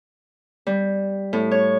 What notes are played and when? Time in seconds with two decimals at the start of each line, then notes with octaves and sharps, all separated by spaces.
0.67 G3
1.33 A2
1.51 C#5